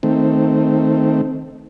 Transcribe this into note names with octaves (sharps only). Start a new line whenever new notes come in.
D#3 A3 C4